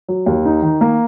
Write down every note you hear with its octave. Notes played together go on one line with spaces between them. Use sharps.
F#3
D#2
D#4
D#3
A#3